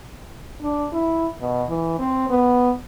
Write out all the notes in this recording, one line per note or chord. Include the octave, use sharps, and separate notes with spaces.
D4
E4
B2
E3
C4
B3